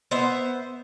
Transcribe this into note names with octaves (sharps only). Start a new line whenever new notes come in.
B3 C5 E5